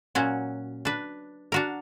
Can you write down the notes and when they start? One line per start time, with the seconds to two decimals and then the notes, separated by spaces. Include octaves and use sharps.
0.15 A#2 F#3 C#4 F#4
0.85 D4 B4
1.52 D4 F#4 A#4